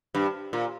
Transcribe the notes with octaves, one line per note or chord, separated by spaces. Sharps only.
G2
A#2